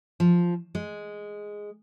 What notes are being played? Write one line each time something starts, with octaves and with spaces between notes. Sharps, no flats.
F3
G#3